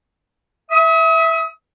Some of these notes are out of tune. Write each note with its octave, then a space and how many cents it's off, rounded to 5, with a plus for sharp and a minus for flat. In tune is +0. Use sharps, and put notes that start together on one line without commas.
E5 +0 D#6 +40